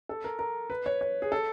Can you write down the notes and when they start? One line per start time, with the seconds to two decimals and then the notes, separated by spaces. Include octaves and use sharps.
0.09 A4
0.24 A#4
0.39 A#4
0.70 B4
0.86 C#5
1.01 C#5
1.22 G#4
1.32 A4